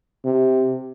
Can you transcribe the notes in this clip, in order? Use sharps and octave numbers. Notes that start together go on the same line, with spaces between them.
C3